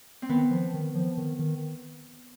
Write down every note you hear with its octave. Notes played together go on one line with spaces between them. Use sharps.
C4
D#3 B3
F3
D#3
F3
D#3
D#3